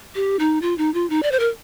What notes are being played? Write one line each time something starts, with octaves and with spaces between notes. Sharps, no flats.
G4
D#4
F4
D#4
F4
D#4
D5
C5
A#4